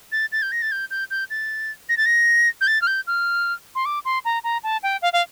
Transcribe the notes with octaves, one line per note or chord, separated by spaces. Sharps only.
A6
A6
G6
A#6
A6
G6
G6
G6
A6
A#6
A6
A#6
G6
A6
F6
G6
F6
C6
D6
C6
A#5
A#5
A5
G5
F5
F5